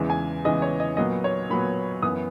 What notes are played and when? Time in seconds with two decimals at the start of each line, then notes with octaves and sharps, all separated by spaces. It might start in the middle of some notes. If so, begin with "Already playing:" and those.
Already playing: E2 C#3 E3 G#3
0.10 G#5
0.45 E2 C#3 E3 G#3 D#5
0.62 C#5
0.80 D#5
0.97 A#2 F#3 B3 D#5
1.24 C#5
1.50 A#2 F#3 B3 B5
2.02 F#2 E3 B3 D#6